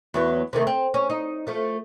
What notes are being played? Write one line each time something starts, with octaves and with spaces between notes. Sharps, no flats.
E2 F#3 B3
C3 D#3 A3
C4
C#4
D#4
F3 A3